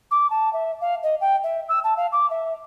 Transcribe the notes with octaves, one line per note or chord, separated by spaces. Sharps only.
D6
A5
E5
F5
D#5
G5
E5
E6
A5
F5
D6
E5